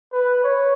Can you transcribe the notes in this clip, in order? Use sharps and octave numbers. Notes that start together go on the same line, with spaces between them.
B4
C#5